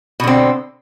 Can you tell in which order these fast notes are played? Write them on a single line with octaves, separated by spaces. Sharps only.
B2 D3 C4